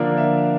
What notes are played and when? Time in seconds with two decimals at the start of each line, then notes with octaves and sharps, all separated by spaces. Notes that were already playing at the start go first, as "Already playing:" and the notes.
Already playing: D3 F3 A#3 D4 A#4
0.17 E5